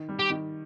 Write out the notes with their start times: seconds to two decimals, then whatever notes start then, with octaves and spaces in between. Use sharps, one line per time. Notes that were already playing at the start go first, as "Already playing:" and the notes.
Already playing: D#3
0.09 G3
0.19 G4
0.30 D#3